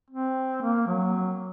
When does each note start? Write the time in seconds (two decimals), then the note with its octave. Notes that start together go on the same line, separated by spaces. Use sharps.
0.10 C4
0.62 A#3
0.87 F#3